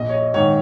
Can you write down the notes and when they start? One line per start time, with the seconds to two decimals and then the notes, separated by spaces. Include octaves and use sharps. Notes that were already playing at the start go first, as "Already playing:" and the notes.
Already playing: A#1 D#5
0.09 C#5
0.14 D#5
0.34 G#2 D#3 C#5